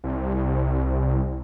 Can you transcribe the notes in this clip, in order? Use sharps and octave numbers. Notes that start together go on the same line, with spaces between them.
C2